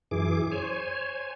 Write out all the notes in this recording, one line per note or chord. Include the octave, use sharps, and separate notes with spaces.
F#2 E3 G#4 D6
C5 C#5 G#5